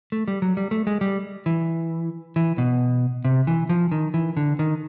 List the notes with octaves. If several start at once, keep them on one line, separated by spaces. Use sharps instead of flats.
A3
G3
F#3
G3
A3
G#3
G3
E3
E3
B2
C3
E3
F3
D#3
E3
D3
D#3